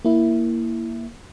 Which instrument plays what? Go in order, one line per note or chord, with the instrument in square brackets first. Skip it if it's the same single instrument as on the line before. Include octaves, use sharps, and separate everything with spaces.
[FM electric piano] A#3 E4